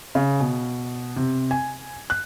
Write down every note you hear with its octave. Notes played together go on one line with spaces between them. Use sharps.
C#3
B2
C3
G#5
F#6